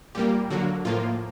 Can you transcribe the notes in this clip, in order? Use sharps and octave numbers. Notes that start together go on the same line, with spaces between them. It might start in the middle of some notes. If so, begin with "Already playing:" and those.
A#2 G3 A#3 G4
D3 F#3 A#3 F#4
A2 F3 A#3 F4